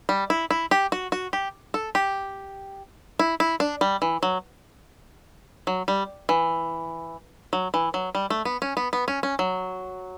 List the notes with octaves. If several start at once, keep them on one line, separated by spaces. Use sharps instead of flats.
G3
E4
E4
G4
F#4
F#4
G4
A4
G4
E4
E4
D4
G3
E3
F#3
F#3
G3
E3
F#3
E3
F#3
G3
A3
B3
C#4
B3
B3
C#4
C#4
F#3